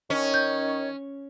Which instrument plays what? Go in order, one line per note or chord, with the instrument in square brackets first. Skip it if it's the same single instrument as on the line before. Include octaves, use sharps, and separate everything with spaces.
[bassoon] D#3 [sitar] C#4 [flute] C#5
[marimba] G6